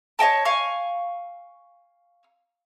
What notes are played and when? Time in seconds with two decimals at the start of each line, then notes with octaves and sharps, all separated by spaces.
0.19 C#5 D#5 G5 A5
0.45 F5 G#5 C#6